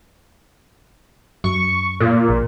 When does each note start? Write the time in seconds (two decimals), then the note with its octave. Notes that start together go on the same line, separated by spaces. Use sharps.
1.44 F#2 C#6
2.00 A#2
2.29 A#1